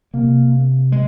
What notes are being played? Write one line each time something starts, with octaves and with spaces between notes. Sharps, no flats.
C3 A#3
G#3